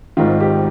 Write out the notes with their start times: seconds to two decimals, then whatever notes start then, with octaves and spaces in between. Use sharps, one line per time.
0.17 G#1 G#2 D#3 F4
0.40 G4